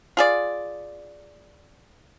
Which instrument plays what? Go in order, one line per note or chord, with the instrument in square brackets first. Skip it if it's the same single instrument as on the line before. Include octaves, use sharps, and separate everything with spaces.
[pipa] F4 G#4 D5